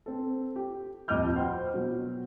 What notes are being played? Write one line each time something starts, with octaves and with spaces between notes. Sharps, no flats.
C4 A4
G4
D#1 F2 D#5 D6 F6 G6
F#4 C5 G5 B5
B2 F#3